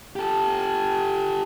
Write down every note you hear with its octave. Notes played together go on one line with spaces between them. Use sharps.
G4 A4